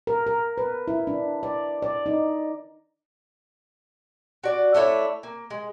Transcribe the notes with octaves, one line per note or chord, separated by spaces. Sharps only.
A#4
A#4
B4
E4
D4
D5
D5
D#4
F#4 D5
A3 D4 E4 C#5
A#3
G#3